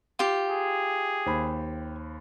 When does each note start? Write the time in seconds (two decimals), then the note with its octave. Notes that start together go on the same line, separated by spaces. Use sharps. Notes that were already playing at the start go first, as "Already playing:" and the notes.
0.19 F4 G4
0.50 G#4
1.26 D#2 C5 B5